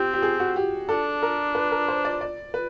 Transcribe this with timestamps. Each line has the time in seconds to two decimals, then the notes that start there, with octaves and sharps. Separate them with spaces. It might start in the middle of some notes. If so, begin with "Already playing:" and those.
Already playing: C4 G4
0.13 G4
0.22 G#4
0.40 F#4
0.56 G4
0.89 D4 A4
1.22 A#4
1.55 B4
1.71 A#4
1.88 C5
2.05 D5
2.21 D5
2.54 B4